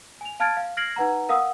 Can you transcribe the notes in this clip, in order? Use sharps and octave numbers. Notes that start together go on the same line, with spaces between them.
G#5 F7
F5 A5 F6 G#6 A6 D7
F5
F6 G#6 A#6 C7 D7 F#7
D#4 B4 F#5 A#5
A#4 F5 F#5 D#6 E6